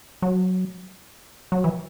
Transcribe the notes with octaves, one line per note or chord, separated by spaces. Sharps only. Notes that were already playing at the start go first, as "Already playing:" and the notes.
F#3
F#3
E3